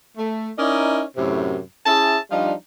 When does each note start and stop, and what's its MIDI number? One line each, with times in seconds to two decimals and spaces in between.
0.18 0.50 57
0.58 1.02 61
0.58 1.02 63
0.58 1.02 64
0.58 1.02 70
0.58 1.02 74
0.58 1.02 75
1.17 1.59 42
1.17 1.59 45
1.17 1.59 48
1.86 2.18 61
1.86 2.18 64
1.86 2.18 68
1.86 2.18 76
1.86 2.18 81
2.31 2.52 53
2.31 2.52 55
2.31 2.52 62
2.31 2.52 63
2.31 2.52 65